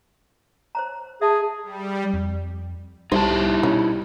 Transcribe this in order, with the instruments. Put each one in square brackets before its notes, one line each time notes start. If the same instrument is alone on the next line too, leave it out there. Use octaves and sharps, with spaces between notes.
[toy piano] C5 C#5 A#5
[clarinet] G#4 [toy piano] E5 A5
[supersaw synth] G3
[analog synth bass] F2
[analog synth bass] C2 [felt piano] G3 [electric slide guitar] D#4 E4 A5 [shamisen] C5
[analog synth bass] B2 [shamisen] C#4